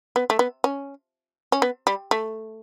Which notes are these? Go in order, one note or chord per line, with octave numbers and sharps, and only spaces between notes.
B3
A3
B3
C#4
C#4
B3
G3
A3